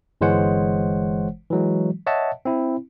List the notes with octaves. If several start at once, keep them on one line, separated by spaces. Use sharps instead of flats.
G1 E3 G#3 C5 C#5 F#5
E3 F#3 G#3
C#5 D#5 E5 F#5 A5
C4 E4